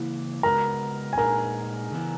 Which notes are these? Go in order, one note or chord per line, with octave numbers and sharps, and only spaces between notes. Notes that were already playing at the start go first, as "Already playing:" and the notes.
Already playing: C#3 E3 A#3 E4
C#3 G#3 B3 F#4 A#4 B4 A#5
G#5
A#2 G#3 D#4 G#4 A#4 B4 A#5
C#3 E3 B3 E4